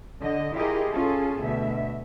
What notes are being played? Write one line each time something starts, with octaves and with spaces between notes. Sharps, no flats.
D3 D#5
E4 F4 G4 G#4 A#4 D#5
C#4 F4 G#4 A4
D2 B2 E5